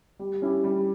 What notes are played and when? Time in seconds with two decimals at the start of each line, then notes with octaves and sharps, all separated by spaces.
0.19 G3
0.42 C#4 E4 G4
0.64 G3